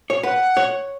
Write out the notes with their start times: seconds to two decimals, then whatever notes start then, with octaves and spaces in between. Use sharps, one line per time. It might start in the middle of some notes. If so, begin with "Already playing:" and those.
0.10 C#5
0.23 B4 F#5
0.57 C#5